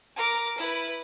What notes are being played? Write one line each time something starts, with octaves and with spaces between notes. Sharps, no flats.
A#4 D6
E4 B4